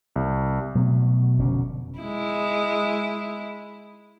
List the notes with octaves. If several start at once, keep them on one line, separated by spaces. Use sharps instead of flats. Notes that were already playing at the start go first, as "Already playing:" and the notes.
C2
B2 F#3 A3
F1 B2 D3 C#4
G#3 E4